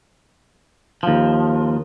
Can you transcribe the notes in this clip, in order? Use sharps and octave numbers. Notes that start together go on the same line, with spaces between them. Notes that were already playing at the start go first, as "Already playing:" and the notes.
D#2 F3